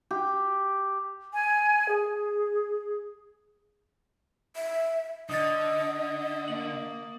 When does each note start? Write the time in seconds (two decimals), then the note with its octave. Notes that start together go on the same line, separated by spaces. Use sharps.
0.11 G4
1.33 G#5
1.88 G#4
4.56 E5
5.30 D3 D#5 D#6 A6
6.48 A#3 F#7